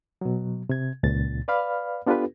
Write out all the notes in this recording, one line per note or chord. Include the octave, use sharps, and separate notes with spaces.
B2 F#3
C3 G#6
C#2 A#2 A6
B4 D5 F5 B5 F6
B3 D4 F4 G4 A4 B4